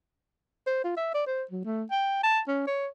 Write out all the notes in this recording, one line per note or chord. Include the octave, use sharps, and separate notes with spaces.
C5
F4
E5
D5
C5
F#3
A3
G5
A5
C#4
C#5